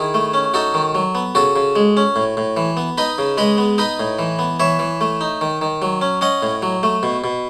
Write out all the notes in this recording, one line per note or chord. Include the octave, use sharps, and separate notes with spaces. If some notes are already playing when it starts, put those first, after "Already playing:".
Already playing: D#3 E4 G#4
A3
C#4
D#4 F#4 A4
D#3
F#3
B3
C#3 F#4 A4
C#3
G#3
C#4
A2
A2
E3
B3
D#4 B4 D#5
C#3
G#3 B4 D#5
B3
D#4 B4 D#5
A2
E3
B3
E3 C#5 E5
E3
A3
D#4
D#3
D#3
F#3
C#4
C#4 D#5 F#5
A2
F#3
A3
B2
B2